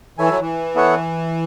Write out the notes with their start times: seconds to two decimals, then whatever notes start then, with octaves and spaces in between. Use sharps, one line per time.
0.18 E3 E4 A4 C#5 E5 G#5
0.29 F#3
0.39 E3
0.75 B3 E4 A4 C#5 F#5